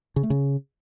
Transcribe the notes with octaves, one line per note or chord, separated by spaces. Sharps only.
C#3
A3
C#3